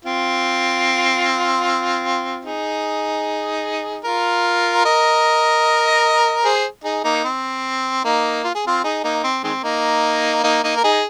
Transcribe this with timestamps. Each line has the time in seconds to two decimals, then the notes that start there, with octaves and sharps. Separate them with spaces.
0.05 C4 F4
2.45 D#4 G#4
4.05 F4 A#4
4.85 A#4 D#5
6.45 G#4 C5
6.84 D#4 G#4
7.04 A#3 D#4
7.24 C4
8.04 A#3 D#4
8.44 F4
8.55 G#4
8.67 C4 F4
8.84 D#4 G#4
9.04 A#3 D#4
9.24 C4
9.44 D#3 G#3 C4
9.64 A#3 D#4
10.43 A#3 D#4
10.64 A#3 D#4
10.77 A#4
10.84 D#4 G#4